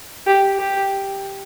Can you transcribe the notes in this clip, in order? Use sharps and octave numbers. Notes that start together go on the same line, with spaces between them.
G4
G4